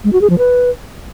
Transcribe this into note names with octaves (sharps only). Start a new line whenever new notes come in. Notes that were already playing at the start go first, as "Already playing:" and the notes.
G#3
F#4
G#4
F3
B4